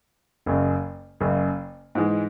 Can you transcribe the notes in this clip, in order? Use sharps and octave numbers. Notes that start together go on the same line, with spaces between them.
F#1 F#2 C#3
F#1 F#2 C#3
G#2 E3 G#3